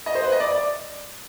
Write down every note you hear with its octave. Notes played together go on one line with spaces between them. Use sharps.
D#5
C5
B4
D#5
D5
D5